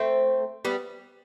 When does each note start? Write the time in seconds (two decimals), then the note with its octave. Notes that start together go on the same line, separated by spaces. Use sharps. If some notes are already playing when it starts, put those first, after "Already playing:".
Already playing: A3 C4
0.65 G3 B3